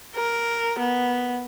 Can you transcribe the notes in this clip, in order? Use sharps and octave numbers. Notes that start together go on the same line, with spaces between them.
A#4
B3